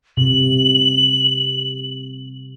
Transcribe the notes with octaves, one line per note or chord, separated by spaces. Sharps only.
C3 F#7